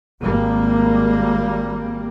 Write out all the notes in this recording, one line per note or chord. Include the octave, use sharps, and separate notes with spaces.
G#1 G3 A#3